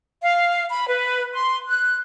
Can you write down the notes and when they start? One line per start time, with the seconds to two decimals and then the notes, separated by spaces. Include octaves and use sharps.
0.22 F5
0.70 B5
0.88 B4
1.34 C6
1.69 F#6